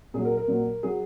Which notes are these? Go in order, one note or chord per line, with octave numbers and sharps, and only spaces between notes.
A#2 F#3 G#4
A#4
A#4
A#2 F#3
F#3 G#4